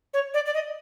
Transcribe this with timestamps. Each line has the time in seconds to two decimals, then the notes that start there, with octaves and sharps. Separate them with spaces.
0.14 C#5
0.34 D5
0.46 D5
0.54 D#5